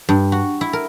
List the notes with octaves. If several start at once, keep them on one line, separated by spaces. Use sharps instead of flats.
G2
F#4
E4
A#4